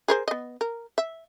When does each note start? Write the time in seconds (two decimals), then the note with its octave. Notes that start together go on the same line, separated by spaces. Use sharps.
0.08 G#4 A#4 C5
0.28 B3 D#5
0.61 A#4
0.98 E5